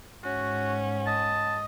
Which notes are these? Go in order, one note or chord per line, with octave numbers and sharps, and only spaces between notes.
G#2 C#4 F#4 F#5
D#5 A5